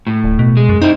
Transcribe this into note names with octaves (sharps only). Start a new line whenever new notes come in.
A2
D1
B2
G#3
F#2
C4 D#4 E4